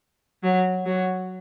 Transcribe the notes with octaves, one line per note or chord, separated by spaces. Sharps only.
F#3
F#3